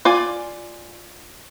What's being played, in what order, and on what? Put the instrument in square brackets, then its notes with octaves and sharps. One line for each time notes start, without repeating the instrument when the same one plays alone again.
[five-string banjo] F4 D5 G#5